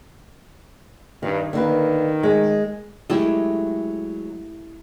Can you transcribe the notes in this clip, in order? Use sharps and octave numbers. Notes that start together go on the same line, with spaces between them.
G2 D#3
D3 D#3 A#3 B4
G#3
F#3 G#3 A3 E4 G4